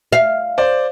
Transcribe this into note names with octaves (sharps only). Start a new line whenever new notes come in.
F5
C5 D5